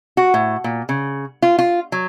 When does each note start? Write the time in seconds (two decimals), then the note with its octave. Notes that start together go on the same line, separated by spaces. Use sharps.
0.17 F#4
0.34 A2
0.64 A#2
0.89 C#3
1.42 F4
1.59 F4
1.92 F#3